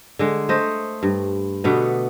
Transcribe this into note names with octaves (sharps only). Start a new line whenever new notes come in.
D3 G#3
A3 C5 D#5
G2
B2 D3 A3 B3